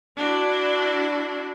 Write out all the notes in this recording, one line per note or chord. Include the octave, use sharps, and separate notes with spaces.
D4 E4 F#4